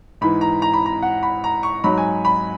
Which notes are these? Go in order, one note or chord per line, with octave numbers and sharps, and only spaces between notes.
G#2 E3 B5
A#5
A#5
B5
A#5
F#5
B5
A#5
C#6
G#2 F#3 B5
G#5
B5